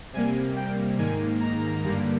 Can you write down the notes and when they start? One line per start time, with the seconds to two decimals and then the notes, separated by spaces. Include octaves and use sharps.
0.13 C3 G3 A#3 G#5
0.56 G5
0.98 G#2 D#3 A#3 G#5
1.40 A#5
1.83 G2 D3 G3 A#3